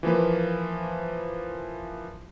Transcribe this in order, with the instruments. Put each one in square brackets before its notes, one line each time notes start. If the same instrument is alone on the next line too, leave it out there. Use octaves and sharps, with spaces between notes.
[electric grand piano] E3 F3 A#3 B4